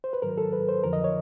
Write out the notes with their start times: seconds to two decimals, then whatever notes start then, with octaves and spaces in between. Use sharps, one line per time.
0.04 C5
0.13 B4
0.22 G#2 D#3 F#3 A#4
0.38 A4
0.53 B4
0.69 C5
0.84 F2 D3 F3 A#4
0.93 D#5
1.04 C#5